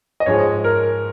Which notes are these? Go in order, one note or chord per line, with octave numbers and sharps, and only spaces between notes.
D#5
G#2 F3 G#3 C#5
A#4